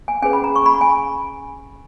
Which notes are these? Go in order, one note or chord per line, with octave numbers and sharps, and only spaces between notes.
G#5
C#4 G#4 B4 G#5
B5
A#5
C#6
B5
G#5